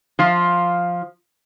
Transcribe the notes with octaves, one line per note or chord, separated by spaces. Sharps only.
F3 F4